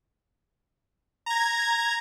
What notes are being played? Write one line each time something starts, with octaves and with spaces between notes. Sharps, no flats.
A#5 G#6